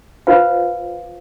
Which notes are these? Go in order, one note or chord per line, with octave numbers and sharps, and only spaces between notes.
F4 B4 C5 F5